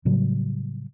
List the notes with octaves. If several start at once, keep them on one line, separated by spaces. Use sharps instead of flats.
A2 C#3 F#3 G3